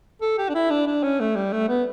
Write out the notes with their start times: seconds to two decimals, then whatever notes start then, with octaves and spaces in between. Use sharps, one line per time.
0.21 A4
0.38 G4
0.49 D4
0.55 E4
0.70 D4
0.87 D4
1.03 C#4
1.20 A3
1.35 G3
1.52 A3
1.69 B3